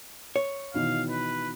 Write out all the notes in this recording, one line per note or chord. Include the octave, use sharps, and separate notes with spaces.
C#5
B2 D#3 E3 F5
B4